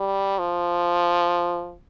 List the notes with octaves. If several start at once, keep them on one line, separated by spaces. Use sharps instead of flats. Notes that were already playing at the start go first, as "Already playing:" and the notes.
Already playing: G3
F3